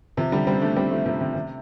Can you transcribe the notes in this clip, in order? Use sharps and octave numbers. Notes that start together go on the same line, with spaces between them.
C3 F3
D3 G3
G3 C4
A3 D4
G3 C4
F3 A3
C3 F3
C3
C3